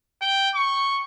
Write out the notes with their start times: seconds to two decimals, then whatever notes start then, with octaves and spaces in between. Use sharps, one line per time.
0.22 G5
0.55 C#6